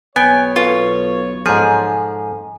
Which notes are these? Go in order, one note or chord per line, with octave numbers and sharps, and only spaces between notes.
B1 B3 C#5 G5 G#5
F4 A4 B4 C#6
G#2 F3 G#4 A4